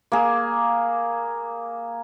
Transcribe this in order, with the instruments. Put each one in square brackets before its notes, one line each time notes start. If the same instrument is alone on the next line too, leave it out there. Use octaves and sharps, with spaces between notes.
[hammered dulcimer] A#3 G#4